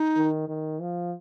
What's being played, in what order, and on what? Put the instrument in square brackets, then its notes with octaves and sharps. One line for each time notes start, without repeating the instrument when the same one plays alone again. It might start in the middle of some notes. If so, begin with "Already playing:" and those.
Already playing: [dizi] D#4
[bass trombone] D#3
D#3
F3